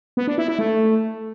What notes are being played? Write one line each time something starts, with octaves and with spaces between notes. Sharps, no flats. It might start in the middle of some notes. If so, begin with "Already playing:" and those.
B3
D4
E4
E4
A3